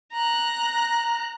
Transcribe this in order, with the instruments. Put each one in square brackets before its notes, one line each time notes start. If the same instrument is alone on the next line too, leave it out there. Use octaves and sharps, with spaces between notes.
[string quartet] A#5 F#6